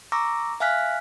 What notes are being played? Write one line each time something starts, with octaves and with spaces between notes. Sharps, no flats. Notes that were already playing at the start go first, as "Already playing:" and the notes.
A#5 C#6 D6 E6 A#6
E5 F5 G#5 F6 F#6 B6